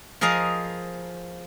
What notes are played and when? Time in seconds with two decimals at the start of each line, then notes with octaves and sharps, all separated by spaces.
0.21 F3 G#4 A#4 D#5 F5